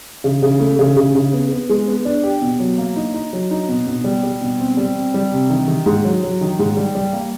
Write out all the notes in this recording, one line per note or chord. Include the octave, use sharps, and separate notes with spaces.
C#3
C#3
A3
C#3
C#3
C#3
B3
B3
G#3
B3
D4
G4
B2
F#3
A#3
D#4
D#4
F#3
D#4
B2
B2
G3
G3
B2
C4
G3
C4
G3
C3
D#3
D#3
G#2
F#3
F#3
D#3
G#2
G3
G3
A#3